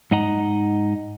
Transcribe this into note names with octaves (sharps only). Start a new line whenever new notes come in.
G#2 D#4 D#5 F#5 A#5